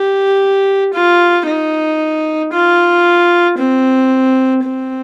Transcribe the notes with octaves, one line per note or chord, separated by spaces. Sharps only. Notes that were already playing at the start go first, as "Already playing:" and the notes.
Already playing: G4
F4
D#4
F4
C4
C4